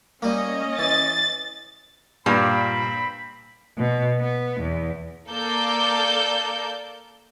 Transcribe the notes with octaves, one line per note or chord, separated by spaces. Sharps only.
G3 A#3 C#4 D#5
E3 A6
G2 A#2 C4 B5
B2
B3
E2
A#3 A4 A#4 D5 G6